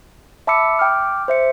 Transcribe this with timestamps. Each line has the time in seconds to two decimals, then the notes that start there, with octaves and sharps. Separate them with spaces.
0.47 E5 A5 B5 D6 E6 C#7
0.79 G5 D6 F6
1.28 C5 E5 C#7